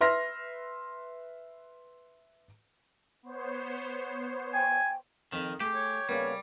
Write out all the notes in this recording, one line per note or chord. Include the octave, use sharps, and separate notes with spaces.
B4 E5 C6 F6 A#6
B3 C5 C#5
G5 G#5
F2 D#3 B5 D#6
A3 G4 G#4
C#5
C#3 G3 A#3 B3